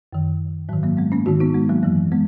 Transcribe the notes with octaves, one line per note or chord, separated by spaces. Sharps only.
F#2 D#3
G#2 D#3 F#3
F#3 A#3
G#3 B3
A#3 C#4
G#2 D#3 D#4 F#4
B3 D#4
G#3 B3
F#3 A#3
F#2 E3 F#3 A#3
G#3 B3